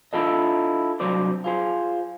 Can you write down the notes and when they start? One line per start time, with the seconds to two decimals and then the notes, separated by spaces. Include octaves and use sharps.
0.13 D4 E4 F4 A4 D#5
1.00 C2 F#3 D4 C5 D5
1.44 F4 G#4 C5